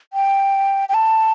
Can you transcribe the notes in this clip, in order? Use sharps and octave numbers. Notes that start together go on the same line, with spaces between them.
G5
G5
A5